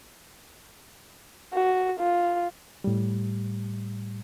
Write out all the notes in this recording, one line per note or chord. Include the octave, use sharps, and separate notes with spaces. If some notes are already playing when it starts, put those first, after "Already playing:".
F#4
F4
A2 G3